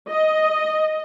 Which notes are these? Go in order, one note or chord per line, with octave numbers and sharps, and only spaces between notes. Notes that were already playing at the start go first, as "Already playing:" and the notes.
D#5